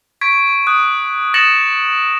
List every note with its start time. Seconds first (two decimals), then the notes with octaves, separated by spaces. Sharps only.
0.21 C#6 G#6 B6 D7
0.67 D#6 F#6
1.34 D#6 A6 A#6 C#7 E7 F#7